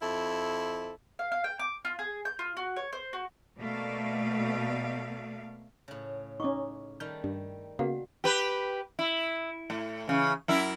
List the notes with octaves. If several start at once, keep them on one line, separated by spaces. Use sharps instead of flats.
F2 E4 A4
F5
F5
G5
D6
F4
G#4
G6
F4
F#4
C#5
C5
F#4
B2 A3 A#3 D5 F5
A2 C#3
C#4 D#4 C#6 D6
D#3 G3 A3 F6 G6
G2
C#3 A#3 B3 F#4 F5 F#5
G4 B4
E4
A2
C#3 E3
F#2 E4 A#4